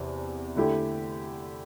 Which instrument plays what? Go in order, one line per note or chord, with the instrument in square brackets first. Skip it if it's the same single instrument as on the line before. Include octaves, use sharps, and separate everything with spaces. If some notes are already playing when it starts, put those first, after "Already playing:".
Already playing: [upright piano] E2 C3 D4
D3 A3 E4 G4